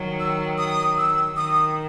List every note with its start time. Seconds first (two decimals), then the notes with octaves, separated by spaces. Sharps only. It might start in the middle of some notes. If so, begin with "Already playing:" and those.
Already playing: D#3 F#3
0.20 E6
0.58 D#6
0.98 E6
1.36 D#3 D#6